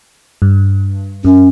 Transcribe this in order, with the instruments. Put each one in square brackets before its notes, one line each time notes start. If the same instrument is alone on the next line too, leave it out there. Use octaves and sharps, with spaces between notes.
[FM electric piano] G2
[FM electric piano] F#2 [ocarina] C#4